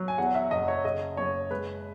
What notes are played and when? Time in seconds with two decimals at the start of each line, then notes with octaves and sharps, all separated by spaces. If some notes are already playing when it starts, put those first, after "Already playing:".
Already playing: F#3
0.08 G#5
0.18 E2 F#5
0.35 E5
0.51 F#1 D#5
0.68 C#5
0.84 C#3 D#5
1.17 F#1 C#5
1.50 G#3 B4